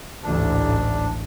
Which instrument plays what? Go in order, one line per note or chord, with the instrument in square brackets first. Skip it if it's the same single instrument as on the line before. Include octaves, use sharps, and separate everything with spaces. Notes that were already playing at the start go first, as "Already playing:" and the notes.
[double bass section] A1 D2 G#2 [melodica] D4